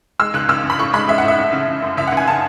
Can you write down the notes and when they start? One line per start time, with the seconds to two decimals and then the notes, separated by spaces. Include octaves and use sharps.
0.20 G#3 E6
0.34 C#2 F#6
0.49 C#2 E6
0.64 C#3
0.70 B5
0.79 A2 C#6
0.94 G#3 B5
1.08 G#3 E5
1.18 F#5
1.23 A2 E5
1.38 F#1
1.53 C#3
1.68 C#3
1.82 F#2
1.97 C#2 E5
2.08 F#5
2.12 C#2 G#5
2.27 C#3 A5